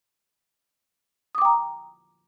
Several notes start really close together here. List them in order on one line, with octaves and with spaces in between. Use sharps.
D#6 D6 G5 A#5